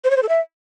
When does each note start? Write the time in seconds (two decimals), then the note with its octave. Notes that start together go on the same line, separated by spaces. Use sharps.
0.04 C5
0.10 C#5
0.16 C5
0.23 A4
0.29 E5